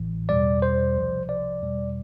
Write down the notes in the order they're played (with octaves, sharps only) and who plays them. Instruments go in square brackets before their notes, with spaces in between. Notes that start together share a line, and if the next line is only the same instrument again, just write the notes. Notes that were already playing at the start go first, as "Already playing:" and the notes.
Already playing: [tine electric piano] A1 A2 E3
E2 B2 G3 D5
C5
C2 C3 F3
D5
E2 B2 G3